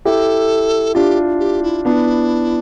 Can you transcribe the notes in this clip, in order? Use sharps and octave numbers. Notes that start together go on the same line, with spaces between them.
E4 G4 A4
D4 F4 G4
G4
E4
B3 D4 E4